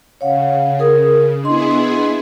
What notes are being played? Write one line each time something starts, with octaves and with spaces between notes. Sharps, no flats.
C#3 C#5 F5 F#5
G#4 A#4 D#6
B3 D4 E4 G#4 D#5 C6